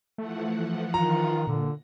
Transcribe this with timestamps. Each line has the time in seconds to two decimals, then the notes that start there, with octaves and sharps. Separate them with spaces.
0.18 E3 F3 A3 F#5
0.94 D#3 F4 A#5
1.47 A#2 D3